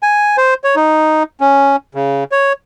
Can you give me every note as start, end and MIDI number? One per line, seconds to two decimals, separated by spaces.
0.03 0.37 80
0.38 0.54 72
0.64 0.75 73
0.76 1.23 63
1.41 1.76 61
1.95 2.24 49
2.32 2.53 73